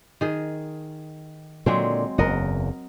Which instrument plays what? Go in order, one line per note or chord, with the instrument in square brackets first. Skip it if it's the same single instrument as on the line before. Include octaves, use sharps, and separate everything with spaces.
[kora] D#3 G#4
[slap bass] A#2 D3 [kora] F#3 G#3 C4
[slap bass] F#1 E2 [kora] A#4 D#5 F#5